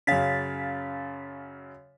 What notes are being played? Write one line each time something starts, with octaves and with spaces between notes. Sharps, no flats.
F#2 C#3 F5 A6 B6